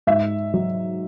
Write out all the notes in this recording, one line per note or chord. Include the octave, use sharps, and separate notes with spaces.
G#2 E5
F#3